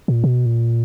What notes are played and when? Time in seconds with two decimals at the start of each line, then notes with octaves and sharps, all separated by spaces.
0.08 A#2
0.24 B2
0.46 A#2